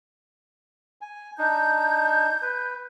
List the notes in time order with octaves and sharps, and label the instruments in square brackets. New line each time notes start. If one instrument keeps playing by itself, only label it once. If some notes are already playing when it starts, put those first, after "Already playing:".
[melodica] G#5
[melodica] D4 D#4 [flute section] G6
[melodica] B4